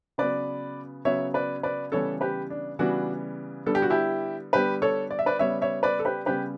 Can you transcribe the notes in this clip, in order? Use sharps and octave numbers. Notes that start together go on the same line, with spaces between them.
C#3 F#3 B3 B4 D5
C#3 F#3 B3 C#5 E5
B4 D5
B4 D5
C#3 E3 G3 B3 A4 C#5
G4 B4
D4
C#3 E3 G3 B3 D4 F#4
D3 G3 B3 A4
G4
F#4
E4 G4
D3 G3 B3 G4 B4
A4 C#5
D5
E5
B4 D5
C#3 G3 B3 C#5 E5
C#5 E5
B4 D5
A4
G4 B4
C#3 G3 B3 G4 B4